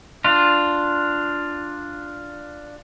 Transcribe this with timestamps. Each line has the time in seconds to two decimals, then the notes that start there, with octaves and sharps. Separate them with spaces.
0.24 D4 F4